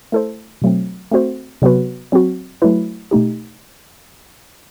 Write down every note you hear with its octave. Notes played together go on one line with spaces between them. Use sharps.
A3 E4 A4 C5
B2 F#3 A3 C4
A3 C4 F#4 C5
C3 F#3 B3 F#4 B4
F#3 C4 F#4
F#3 A3 E4 B4
B2 A3 D#4 G4